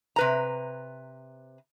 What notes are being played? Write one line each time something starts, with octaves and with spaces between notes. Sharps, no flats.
C3 B4 A#5